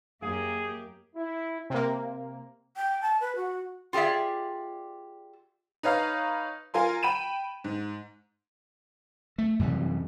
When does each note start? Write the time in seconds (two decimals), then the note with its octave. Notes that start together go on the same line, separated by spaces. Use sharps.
0.22 F#2 E3 A#3 G4 G#4 F5
1.15 E4
1.70 C3 A#3
2.77 G5
3.01 A5
3.21 B4
3.36 F#4
3.93 F4 G4 G#4 D5 E5
5.83 D#4 B4 C#5 F5 A#5
6.74 F4 A#4 G#5 C6
7.03 G5 B5 D#7 E7
7.64 G#2
9.38 A3
9.59 F#2 C3 E3 G3